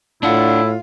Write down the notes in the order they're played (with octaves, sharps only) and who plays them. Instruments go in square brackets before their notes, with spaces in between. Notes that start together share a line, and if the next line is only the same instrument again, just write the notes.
[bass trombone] A2 [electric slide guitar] D4 F#5 [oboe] E4 [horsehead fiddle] F4 F5